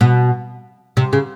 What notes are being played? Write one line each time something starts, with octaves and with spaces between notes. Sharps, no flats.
B2
C3
C#3